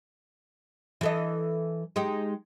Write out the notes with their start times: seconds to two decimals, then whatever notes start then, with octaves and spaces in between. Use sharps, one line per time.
1.01 E3 A4 D#5
1.96 G#3 D#4 G4